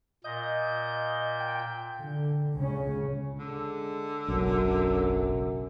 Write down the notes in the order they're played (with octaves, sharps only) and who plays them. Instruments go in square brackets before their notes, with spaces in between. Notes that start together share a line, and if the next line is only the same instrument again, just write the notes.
[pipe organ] A#2 G6 [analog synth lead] D#5
[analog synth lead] G5
[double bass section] D3
C#2 C#3 C#4
[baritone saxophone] D3 [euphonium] G#3
[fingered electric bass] F#1 B1 [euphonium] F#2